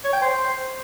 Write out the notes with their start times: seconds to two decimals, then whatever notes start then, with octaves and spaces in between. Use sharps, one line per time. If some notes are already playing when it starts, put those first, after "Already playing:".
0.04 C#5
0.13 G5
0.21 C5